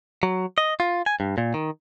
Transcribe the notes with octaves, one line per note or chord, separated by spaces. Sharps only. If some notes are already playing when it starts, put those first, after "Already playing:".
F#3
D#5
F4
G#5
G2
A#2
D#3